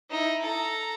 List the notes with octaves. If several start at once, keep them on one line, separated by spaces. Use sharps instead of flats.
D#4 E4
A4 A#5